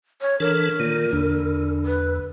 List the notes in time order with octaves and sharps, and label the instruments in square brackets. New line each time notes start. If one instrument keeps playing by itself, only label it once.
[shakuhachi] C#5
[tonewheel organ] E3 D4 A4 [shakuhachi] A#4
[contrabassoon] A#2 [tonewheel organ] D#3
[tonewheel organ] E2 [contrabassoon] D3
[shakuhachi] B4